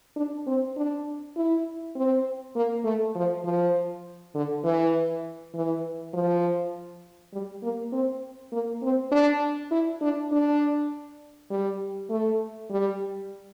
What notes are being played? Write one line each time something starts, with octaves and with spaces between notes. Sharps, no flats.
D4
C4
D4
E4
C4
A#3
A3
F3
F3
D3
E3
E3
F3
G3
A#3
C4
A#3
C4
D4
E4
D4
D4
G3
A3
G3